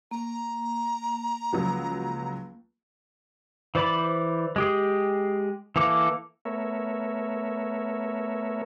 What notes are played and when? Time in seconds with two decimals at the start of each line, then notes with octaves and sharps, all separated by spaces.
0.11 A#3 A#5
1.53 C#2 F3 F#3
3.75 E3 C5 D5 B5
4.56 G#3 G4 G#4
5.76 E3 A#3 A4 D6
6.45 A3 B3 A#4 C#5 E5